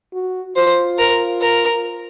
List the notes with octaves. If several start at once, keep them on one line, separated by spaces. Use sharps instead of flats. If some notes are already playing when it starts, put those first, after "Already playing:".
F#4
F4 C5
A#4
A#4